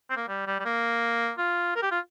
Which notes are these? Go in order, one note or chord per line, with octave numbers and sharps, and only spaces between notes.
C4
A#3
G3
G3
G3
A#3
F4
A#4
G4
F4